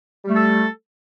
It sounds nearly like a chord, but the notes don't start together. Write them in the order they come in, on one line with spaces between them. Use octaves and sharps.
G3 A3 A4